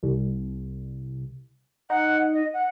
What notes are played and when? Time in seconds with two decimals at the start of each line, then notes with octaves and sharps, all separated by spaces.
0.03 C2
1.90 D#4 F#5
2.33 D#5
2.53 F#5